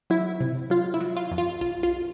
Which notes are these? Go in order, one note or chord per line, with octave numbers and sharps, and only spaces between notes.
F#3 E4
C3
F#3 F4
E4
F#3
F4
F2
F4
B1 F4
F4